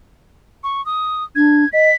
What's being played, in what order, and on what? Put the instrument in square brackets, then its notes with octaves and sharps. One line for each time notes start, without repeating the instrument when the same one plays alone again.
[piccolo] C#6
D#6
[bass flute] D4 [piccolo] G#6
[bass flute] D#5 [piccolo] B6